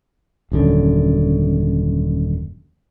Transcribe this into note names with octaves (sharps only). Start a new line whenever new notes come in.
D#1 F#2 D3